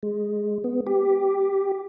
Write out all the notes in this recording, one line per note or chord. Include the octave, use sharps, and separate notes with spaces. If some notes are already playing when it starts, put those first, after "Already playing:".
G#3
B3
G4